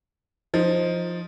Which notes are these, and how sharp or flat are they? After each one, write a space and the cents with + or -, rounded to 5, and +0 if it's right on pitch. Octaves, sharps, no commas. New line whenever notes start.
F3 +0 D#4 +0